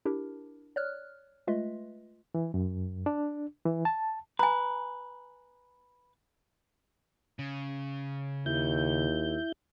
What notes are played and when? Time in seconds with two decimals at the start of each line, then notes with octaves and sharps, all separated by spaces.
0.05 D4 E4 G4 A#4
0.76 C#5 D5 F6 F#6
1.47 G#3 A3 F4 B4 D#5 E5
2.35 E3
2.54 F#2
3.06 D4
3.65 E3
3.85 A5
4.39 B4 G#5 A#5
7.39 C#3
8.46 D#2 E4 G6